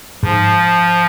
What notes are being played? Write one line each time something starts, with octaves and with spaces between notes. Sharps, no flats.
G#2 F3